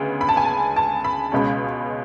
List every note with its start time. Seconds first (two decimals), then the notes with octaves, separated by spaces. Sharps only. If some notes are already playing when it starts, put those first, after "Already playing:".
Already playing: D2 C#3 G#3 B3
0.21 B5
0.29 A5
0.37 G#5
0.45 A5
0.76 A5
1.04 B5
1.32 C#2 B2 G#3 C#4